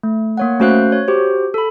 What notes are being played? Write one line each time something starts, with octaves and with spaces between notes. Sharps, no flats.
A3
A#3 C#5 F#5
A3 C#4 F#4 C5 F5 F#6
C#5
F#4 G4 C5
A4 B5